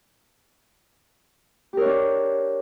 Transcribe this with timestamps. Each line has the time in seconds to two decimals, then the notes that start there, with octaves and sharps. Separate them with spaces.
1.73 G4
1.77 A#4
1.81 C#5
1.85 D4